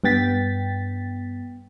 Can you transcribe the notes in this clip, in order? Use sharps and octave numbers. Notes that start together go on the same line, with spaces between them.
G2 B3 G5 A6 B6